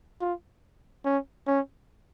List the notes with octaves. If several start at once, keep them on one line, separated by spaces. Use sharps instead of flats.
F4
C#4
C#4